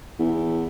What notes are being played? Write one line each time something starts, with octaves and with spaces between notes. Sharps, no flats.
E2